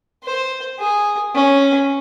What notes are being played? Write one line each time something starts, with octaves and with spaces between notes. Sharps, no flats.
C5
G#4
C#4